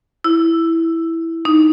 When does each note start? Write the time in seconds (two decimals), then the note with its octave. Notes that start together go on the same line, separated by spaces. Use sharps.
0.24 E4
1.45 D#4